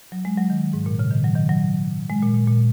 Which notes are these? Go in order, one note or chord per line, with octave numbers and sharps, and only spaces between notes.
F#3
G#3
F#3
D#3
G#2
A#2
C#3
D#3
F#3
D#3
F#3
G#3
A#2
A#2
A#2